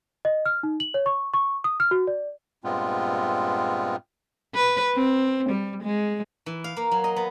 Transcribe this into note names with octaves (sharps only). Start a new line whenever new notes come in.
D#5
F6
D#4
F#7
C#5
C#6
C#6
D#6
F6
F#4
D5
G2 A#2 G#3 B3 C4 F4
B4
C4
G3
G#3
E3
F5
A#3
F#3
D#5
B3